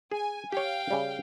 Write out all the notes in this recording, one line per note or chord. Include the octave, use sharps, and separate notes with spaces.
G#4 G#5
G4 C#5 F5 G5
C#3 G3